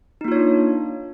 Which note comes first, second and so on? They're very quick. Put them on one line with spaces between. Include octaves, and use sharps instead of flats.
D#4 A#3 F4 C#5 D4